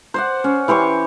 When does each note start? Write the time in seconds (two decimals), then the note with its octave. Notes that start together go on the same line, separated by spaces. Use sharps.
0.14 C5 D5 F#5
0.44 C#4
0.68 E3 G4 C6 C#6